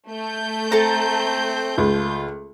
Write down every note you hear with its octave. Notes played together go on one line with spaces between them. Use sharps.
A3 G6
C4 A4 A5 A#5
C#2 F4